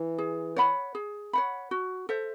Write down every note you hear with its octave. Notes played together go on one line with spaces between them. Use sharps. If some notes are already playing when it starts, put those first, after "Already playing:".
Already playing: E3
G#4
C#5 F#5 B5
G#4
C#5 F#5 B5
F#4
A4 C5 E5